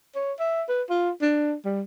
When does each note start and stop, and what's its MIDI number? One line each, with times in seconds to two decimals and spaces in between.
0.15 0.33 73
0.40 0.63 76
0.69 0.82 71
0.90 1.11 65
1.22 1.55 62
1.65 1.82 55